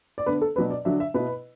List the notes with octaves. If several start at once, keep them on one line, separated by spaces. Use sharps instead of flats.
D5
D3 B3 D4 B4
A4
B2 F#3 D4 B4
D5
D3 F#3 D4 E5
E5
B2 B3 E4 B4